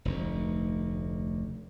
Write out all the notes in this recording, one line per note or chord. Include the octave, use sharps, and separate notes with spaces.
F1 D2